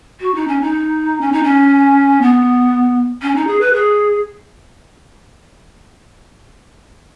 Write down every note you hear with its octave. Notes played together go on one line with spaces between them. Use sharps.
F#4
D#4
C#4
D#4
C#4
D#4
C#4
B3
C#4
D#4
G#4
B4
G#4